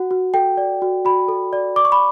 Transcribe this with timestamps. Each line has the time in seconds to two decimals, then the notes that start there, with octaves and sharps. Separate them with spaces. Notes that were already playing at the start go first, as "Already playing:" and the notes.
Already playing: F#4 F#5
0.11 F#4
0.34 A4 G5
0.57 D5
0.82 F#4
1.05 F#4 B5
1.29 A4
1.53 D5
1.76 D5 D6
1.85 C#6
1.92 B5